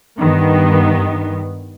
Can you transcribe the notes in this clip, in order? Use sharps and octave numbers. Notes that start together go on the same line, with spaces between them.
G2 D#3 B3